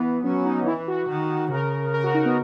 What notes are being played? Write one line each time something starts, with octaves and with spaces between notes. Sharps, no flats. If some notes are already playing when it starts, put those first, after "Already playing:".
Already playing: E3 B3
F#3 C#4
D#4
E3 E4
F#4
D#3
C#3 A#4
A#4
F#4
D#4
B3